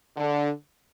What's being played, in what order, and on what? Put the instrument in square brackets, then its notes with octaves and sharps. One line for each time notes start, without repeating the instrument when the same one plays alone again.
[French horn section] D3